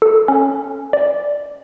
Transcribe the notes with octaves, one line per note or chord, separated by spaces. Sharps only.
A4
C#4
D5